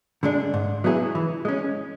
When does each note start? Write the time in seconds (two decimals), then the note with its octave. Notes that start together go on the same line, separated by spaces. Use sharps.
0.23 D3 G#3 D4
0.54 G#2
0.84 F#3 B3 E4 G#4
1.15 E3
1.45 G#3 C#4